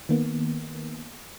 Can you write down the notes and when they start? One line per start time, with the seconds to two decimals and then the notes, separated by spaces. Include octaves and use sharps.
0.09 D#3 A#3 B3